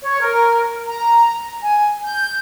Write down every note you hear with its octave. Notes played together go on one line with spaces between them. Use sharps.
C#5
A#4
A#5
G#5
G6